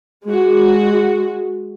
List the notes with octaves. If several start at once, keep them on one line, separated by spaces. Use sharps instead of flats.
G#3 F#4